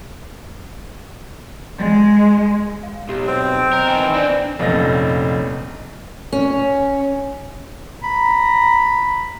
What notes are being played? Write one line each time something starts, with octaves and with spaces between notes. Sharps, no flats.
G#3
F5
B1 G4
C4
A#4 D#5
D#3 E3 D#5 G5 G#5
B3 C4 D4 D5
F1 A#1 C#4 D#4 A#6
C#4
A#5 B5